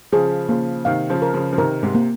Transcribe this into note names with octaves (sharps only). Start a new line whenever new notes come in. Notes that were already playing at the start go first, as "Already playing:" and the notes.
C#3 F3 G#4
C#3 F3 A#3
C3 D#3 F5
C#3 F3
A#4
C#3 F3
F3
C3 D#3 A#4
G#2 C3
A#3